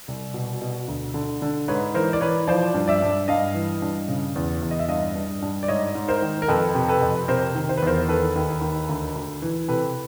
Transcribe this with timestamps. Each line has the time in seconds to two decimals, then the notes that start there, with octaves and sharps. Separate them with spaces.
0.08 C2
0.34 B2
0.62 B2
0.88 D2
1.14 D3
1.42 D3
1.68 G#2 B4 C#5
1.94 E3 A#4 C5
2.13 D5
2.21 E3 B4 C#5
2.48 F3 C5 D5
2.74 G2
2.88 D5 E5
3.02 G2
3.28 G2 D#5 F5
3.54 E3
3.82 G2
4.08 C#3
4.36 E2
4.62 E2
4.71 D#5
4.79 E5
4.88 G2 D#5 F5
5.15 G2
5.42 G2
5.63 D5
5.68 G#2 C#5 D#5
5.95 G#2
6.08 A#4 C5
6.22 D#3
6.42 A#4
6.48 F2 A4 B4
6.75 C3
6.88 A4 B4
7.02 F2
7.28 C3 A#4 C5
7.55 D#3
7.69 C5
7.77 B4
7.82 E2 A#4 C5
8.09 D#3 A4 B4
8.36 D#2
8.61 D#2
8.89 D2
9.15 D2
9.42 E3
9.68 C3 A4 B4